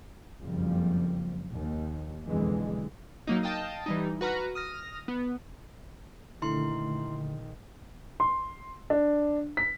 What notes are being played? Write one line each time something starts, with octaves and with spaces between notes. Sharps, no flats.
F#1 F2 F3 G3
D#2
B1 F2 D3 E3 G#3
F#3 A#3 D#4
D#5 F5 G5 A5 D#6
E3 G3 D#4
F#4 B4 A#5 F6
D#6 F6 A#6
B3
A#1 D3 D#3 A3 E4 C6
C6
D4
B6